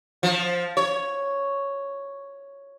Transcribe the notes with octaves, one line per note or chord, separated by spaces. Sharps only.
F3
C#5